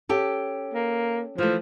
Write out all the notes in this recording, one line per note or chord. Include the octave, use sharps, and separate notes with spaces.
C#4 G4 A4
A#3
E3 F3 A3